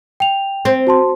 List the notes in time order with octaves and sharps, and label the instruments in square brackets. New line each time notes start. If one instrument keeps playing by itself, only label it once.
[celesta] G5 F7
[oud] C4
[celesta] F#4 A5 C6